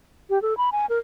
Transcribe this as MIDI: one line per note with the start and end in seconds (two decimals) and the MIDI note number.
0.30 0.41 67
0.42 0.57 69
0.57 0.70 83
0.72 0.86 80
0.90 0.99 70